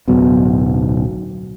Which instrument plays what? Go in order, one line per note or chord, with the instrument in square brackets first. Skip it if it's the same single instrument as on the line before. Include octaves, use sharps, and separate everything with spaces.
[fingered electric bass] D1 B1 B2